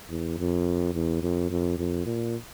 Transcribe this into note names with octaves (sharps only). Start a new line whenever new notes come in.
E2
F2
E2
F2
F2
F2
A#2